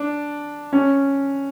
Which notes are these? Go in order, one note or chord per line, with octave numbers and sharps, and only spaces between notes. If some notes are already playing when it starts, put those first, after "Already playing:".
Already playing: D4
C#4